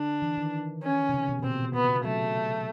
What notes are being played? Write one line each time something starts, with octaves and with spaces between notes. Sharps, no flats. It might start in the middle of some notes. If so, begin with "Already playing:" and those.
Already playing: D3 D4
E3
D#3
C#4
C3
C#3
B2
B2
A#2 C4
B2
C3 B3
C#3
F#3 A3